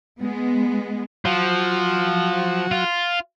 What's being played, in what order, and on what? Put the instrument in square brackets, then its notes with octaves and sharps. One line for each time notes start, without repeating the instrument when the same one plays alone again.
[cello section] G#3 B3
[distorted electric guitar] F3 [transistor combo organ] F#3 F#4
[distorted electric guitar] F4